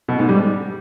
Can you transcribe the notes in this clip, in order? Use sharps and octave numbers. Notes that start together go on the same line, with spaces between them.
B2
G#2
G3